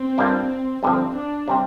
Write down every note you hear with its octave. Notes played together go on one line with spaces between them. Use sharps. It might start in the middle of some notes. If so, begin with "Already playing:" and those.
Already playing: C4
G2 G3 A#3 D4 F4
G2 D3 F3 C4
D4
C3 G3 C4